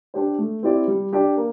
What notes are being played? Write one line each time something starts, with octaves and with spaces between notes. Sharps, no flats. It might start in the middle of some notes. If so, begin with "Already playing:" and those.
D4 G4 C5
A3
C4 E4 G4 D5
G3
D4 G4 D5
A#3